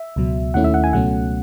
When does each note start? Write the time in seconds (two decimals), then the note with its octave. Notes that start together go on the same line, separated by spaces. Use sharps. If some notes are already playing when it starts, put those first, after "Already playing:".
Already playing: E5
0.16 C#2 B2 F#3
0.54 D#2 D#3 A3 C#4 E4 F#5
0.64 E5
0.74 F#5
0.84 G#5
0.93 C#2 B2 F#3 A3 C#4 F#5